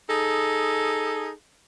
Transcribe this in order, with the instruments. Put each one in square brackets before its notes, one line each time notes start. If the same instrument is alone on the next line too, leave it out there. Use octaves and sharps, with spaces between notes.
[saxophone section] D#4 G#4 A4